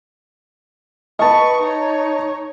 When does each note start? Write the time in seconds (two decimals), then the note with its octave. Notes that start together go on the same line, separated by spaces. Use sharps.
1.19 B4 D#5 A5 C#6
1.62 D#4 C#5